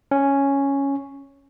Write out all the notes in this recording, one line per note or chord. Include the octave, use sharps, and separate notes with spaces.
C#4